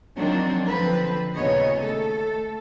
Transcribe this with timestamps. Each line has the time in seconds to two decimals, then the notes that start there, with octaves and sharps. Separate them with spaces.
0.17 D#3 F3 F#3 A#3 C4 D4
0.68 D3 F3 C4 B4
1.35 D#2 A#2 C#3 B3 C#5 D#5
1.79 A3 A4